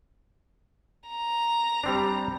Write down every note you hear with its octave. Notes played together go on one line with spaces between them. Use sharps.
A#5
G3 C4 D4